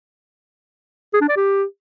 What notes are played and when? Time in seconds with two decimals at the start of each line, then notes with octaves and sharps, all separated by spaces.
1.13 G#4
1.21 D4
1.29 D5
1.36 G4